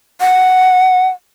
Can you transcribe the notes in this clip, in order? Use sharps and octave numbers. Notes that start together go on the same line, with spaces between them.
F#5